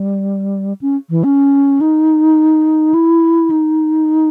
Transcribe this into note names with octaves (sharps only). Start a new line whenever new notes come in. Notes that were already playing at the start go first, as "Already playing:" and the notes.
Already playing: G3
C#4
E3
C#4
D#4
E4
D#4